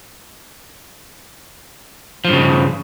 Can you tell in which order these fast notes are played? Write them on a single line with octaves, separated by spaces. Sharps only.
F3 G2 C#3